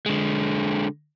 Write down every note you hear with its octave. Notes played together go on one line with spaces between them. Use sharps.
D3 G#3